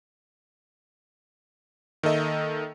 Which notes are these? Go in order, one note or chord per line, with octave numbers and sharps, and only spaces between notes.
D#3 A#3 A4 D#5 E5